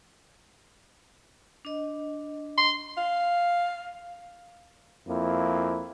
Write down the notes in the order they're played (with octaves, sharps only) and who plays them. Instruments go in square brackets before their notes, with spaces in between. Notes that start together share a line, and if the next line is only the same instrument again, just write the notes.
[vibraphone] D4 D#5
[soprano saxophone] C6
[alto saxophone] F5
[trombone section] F2 A#3 E4